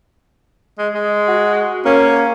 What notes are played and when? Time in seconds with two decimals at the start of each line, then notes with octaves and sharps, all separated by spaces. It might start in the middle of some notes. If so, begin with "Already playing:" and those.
0.79 G#3
0.95 G#3
1.28 F#4
1.86 A#3 C#4